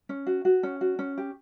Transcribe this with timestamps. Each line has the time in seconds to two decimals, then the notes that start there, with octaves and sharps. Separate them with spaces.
0.09 C#4
0.26 F#4
0.45 F#4
0.63 C#4
0.81 F#4
0.99 C#4
1.18 G4